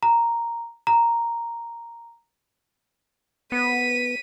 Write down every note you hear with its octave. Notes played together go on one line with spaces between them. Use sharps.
A#5
A#5
B3 B6 D#7